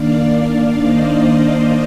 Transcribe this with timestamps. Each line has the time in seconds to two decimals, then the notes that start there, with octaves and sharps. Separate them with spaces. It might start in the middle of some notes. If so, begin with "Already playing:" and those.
Already playing: D#3 A#3 D4 D5 F5
0.81 C5 D#5
1.25 C5 D#5